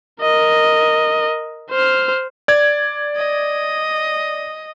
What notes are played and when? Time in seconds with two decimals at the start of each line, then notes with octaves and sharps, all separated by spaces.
0.21 A#4 D#5
1.71 C5 F6
2.48 D5 G#6
3.16 D#5